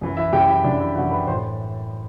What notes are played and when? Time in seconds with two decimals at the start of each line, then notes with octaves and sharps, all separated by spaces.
0.01 F#2 E3
0.17 E4 E5
0.33 F#2 E3 G4 G5
0.48 E4 E5
0.64 F#2 E3 D4 D5
0.80 E4 E5
0.95 E3 F#4 F#5
0.99 F#2
1.11 B4 B5
1.27 A2 E3 C5 C6